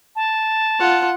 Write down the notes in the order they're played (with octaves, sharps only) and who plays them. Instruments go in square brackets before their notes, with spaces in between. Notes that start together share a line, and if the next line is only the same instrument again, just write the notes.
[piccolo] A5
[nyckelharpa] F4 F#5